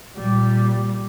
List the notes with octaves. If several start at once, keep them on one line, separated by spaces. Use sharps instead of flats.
A#2 G3